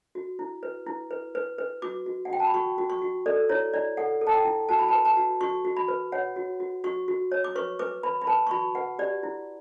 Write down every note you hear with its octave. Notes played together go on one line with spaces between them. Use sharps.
F#4
E4
B4
E4
B4
B4
B4
F#4 D6
F#4
F#5
F#4 G5
A5
B5
F#4 C#6
F#4
C#6
F#4
A4 D5
E4 C#5
E4 D5
A4 F#5
A4
A5
G5
E4
F#4 A5
B5
B4 A5
A5
F#4
F#4 C#6
F#4
B5
B4
C#5 F#5
F#4
F#4
F#4 C#6
F#4
C#5
D6
B4 C#6
B4 D6
B4 B5
B5
B4 A5
C#6
F#4 B5
B4 F#5
G4 D5
E4